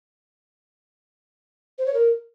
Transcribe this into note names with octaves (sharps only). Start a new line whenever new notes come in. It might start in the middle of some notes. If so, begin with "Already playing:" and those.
C5
C#5
A#4